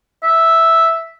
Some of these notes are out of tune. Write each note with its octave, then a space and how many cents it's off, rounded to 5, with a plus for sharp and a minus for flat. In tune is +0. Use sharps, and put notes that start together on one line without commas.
E5 -5